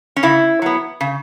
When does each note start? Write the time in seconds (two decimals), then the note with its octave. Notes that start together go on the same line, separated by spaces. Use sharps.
0.16 C#4
0.23 C#3 E4
0.62 F#3 B3
1.01 C#3